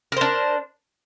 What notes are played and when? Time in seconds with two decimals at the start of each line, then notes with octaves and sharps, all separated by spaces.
0.12 A#4
0.17 C5
0.21 D4